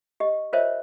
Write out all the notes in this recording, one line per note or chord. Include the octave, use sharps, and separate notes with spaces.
G4 D#5
F4 A#4 C5 C#5 D#5 E5